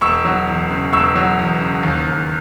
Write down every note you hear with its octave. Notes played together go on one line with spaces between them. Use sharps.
E1 C#6 E6
F#3
E2
C#3
E1 C#6 E6
F#3
E2
C#3
D#2
D#2